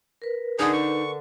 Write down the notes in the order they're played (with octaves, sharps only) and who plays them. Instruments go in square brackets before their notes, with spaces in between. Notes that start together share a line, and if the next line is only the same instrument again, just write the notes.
[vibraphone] A#4 B4
[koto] D3 D4 [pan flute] D#4 [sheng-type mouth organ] G#4
[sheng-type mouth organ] C#6